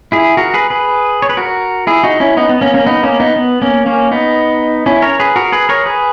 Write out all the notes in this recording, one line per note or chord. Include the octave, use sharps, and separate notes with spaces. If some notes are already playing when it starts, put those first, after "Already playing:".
E4 G#4
F#4 A#4
G#4 B4
G#4 B4
C#5
B4
F#4 A#4
E4 G#4
D#4 F#4
C#4 E4
B3 D#4
B3
A#3 C#4
A#3 C#4
B3 D#4
A#3 C#4
B3 D#4
B3
A#3 C#4
A#3 C#4
B3 D#4
C#4 E4
A#4 C#5
G#4 B4
F#4 A#4
G#4 B4
A#4 C#5
G#4 B4